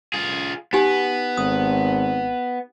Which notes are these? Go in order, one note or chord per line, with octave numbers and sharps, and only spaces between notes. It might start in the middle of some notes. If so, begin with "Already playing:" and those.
F4 G#4
B3 D#4 G4 G#5
G#1 D#6